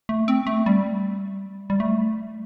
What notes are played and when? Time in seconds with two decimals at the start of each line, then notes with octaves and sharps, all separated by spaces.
0.09 A3
0.28 C4
0.47 A3
0.66 G3
1.70 G3
1.80 A3